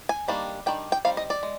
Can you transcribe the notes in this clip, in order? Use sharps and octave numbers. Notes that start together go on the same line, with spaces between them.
G#5
D#3 G3 A#3 D4
D#3 G3 D4 G5
G5
G3 C4 D#4 F5
D#5
D5
G#3